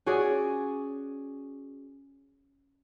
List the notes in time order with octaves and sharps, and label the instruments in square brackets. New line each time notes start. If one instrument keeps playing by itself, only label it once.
[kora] C#4 F#4 G#4 D5